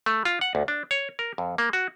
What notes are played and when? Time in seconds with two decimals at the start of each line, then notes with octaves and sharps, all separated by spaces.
0.06 A3
0.25 F4
0.41 F#5
0.55 D2
0.68 D4
0.91 C#5
1.19 A#4
1.38 F2
1.58 A#3
1.73 F#4